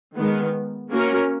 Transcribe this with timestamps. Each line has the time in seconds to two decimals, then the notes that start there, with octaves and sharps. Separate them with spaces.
0.17 D#3 G#3 B3
0.91 A#3 C#4 F#4 A#4